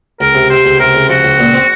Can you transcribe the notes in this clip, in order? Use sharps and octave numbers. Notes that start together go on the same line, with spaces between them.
C#2 A#4
C3
C3 C5
C#2
C3 A#4
C#2
F3 F#4
C#2
A#2
C4